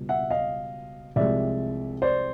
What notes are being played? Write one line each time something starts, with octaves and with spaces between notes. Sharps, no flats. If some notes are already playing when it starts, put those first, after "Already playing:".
Already playing: C#2 B2 G3
E5 F#5
D#5 F5
C2 C3 F3 G#3 D5 E5
C5 D5